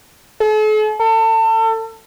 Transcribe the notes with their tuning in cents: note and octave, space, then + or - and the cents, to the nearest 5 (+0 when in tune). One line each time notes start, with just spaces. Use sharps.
A4 -45
A4 +30